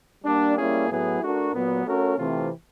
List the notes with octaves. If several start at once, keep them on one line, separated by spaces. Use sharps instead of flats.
G3 A#3 D4
G3 A#3 C#4 E4 G#4
A2 F#3 B3 E4 G#4
A3 D4 F#4 A#4
A#2 F#3 B3
A3 C#4 F#4 A#4 C#5
C3 E3 A3 C4 F4